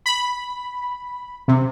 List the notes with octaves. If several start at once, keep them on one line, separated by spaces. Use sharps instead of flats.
B5
C3